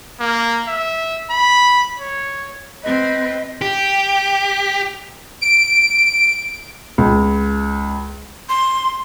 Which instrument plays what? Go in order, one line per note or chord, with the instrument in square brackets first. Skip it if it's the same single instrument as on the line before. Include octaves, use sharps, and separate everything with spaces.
[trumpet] A#3
E5
B5
C#5
[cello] C4 B4 [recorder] D#5
[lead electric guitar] G4
[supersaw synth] D7
[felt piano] C#2
[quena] C6